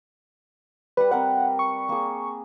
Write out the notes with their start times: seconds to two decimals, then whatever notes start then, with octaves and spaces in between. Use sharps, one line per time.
0.97 G3 B4 F#5
1.11 C4 A#4 B4 F#5
1.59 C#6
1.89 A#3 G#4